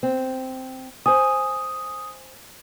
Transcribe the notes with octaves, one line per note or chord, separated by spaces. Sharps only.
C4
C5 G#5 D#6